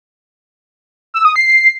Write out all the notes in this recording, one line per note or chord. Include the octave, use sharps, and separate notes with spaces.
E6
D#6
C7